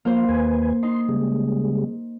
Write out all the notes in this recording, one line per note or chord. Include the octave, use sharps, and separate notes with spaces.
F3 A#3 C5 F5 C6
D#2 B4 G#5
D#4 C6
C#3 G3 G#3